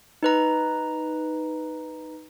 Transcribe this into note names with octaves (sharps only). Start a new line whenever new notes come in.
D#4 B4 A#5